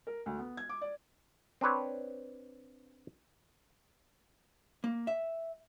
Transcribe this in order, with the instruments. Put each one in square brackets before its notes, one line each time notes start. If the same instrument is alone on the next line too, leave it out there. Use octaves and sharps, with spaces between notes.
[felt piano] A#4
D2
B3
G#6
D6
D5
[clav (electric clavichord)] C4 D4 B4 C#5
[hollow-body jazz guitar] A#3
E5